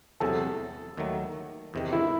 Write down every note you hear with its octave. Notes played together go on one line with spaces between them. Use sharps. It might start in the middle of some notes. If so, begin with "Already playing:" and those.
E2 C3 F#3 A4
D#2 D#3 F#3 A3
E2 C3 D#3
E4